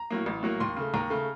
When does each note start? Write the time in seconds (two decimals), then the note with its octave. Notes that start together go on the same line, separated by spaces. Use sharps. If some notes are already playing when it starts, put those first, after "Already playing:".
Already playing: A#5
0.11 A2 F#3 A#3
0.26 A1
0.43 A2 F#3 A#3
0.60 D#2 C6
0.76 C#3 A3
0.94 D#2 A#5
1.10 C#3 A3